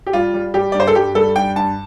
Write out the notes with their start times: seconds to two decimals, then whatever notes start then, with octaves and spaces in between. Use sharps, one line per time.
0.07 G4
0.13 G3 F4
0.34 G3
0.54 G3 G4
0.72 G2 D5
0.80 C5
0.87 A4
0.95 G2 G4
1.15 G3 A4
1.36 G2 G5
1.56 G2 A5